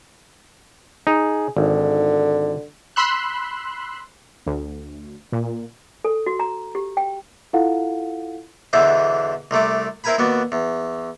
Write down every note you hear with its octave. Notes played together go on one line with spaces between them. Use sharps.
D#4 G#4
G#1 D3
B5 C6 E6 F#6
D2
A#2
A4
F#4
A#5
G4
G5
E4 F4 A4 F5 F#5
B1 E2 D3 E3 C5 E5
C2 C3 A3 D6
C4 E4 A#4 G#5 A#5 B5
D#2 B3 F#4 D5
E2